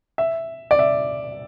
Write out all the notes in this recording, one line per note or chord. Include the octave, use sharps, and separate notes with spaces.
E5
D5
E5